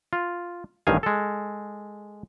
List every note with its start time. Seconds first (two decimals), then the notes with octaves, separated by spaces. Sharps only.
0.13 F4
0.87 A1 G2 D#3 F5 G#5
1.03 G#3 A4